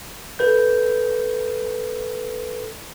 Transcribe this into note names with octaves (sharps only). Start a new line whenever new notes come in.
A4 B4 G6